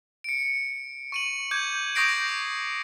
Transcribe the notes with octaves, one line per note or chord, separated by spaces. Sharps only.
C#7 D7
C#6 D#7 F#7
D6 G6 G#6 F#7
C#6 D#6 G6 A#6 C7 D7